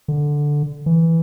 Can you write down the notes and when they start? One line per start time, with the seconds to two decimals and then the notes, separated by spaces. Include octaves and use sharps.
0.08 D3
0.86 E3